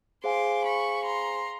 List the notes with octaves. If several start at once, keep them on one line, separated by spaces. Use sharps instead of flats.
G#4 C5 F5 G#5 C6 D6
B5 C#6
A#5 C6